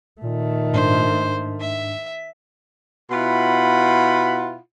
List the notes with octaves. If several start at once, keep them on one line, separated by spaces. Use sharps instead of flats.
A#2 D#3 A3
G#2 D4 C5
E5 B6
B2 E4 F4 F#5 B5